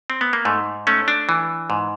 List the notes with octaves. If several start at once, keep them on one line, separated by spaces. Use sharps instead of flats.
C4
B3
A#3
G#2 A3
A3 C#4
D4
E3
G#2